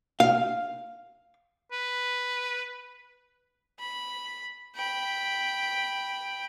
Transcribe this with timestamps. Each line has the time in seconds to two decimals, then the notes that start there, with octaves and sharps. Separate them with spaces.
0.20 F5
1.72 B4
3.79 B5
4.75 G5 B5